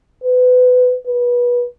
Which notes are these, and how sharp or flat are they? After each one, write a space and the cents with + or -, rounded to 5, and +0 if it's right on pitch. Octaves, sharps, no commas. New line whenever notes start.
B4 +25
B4 -25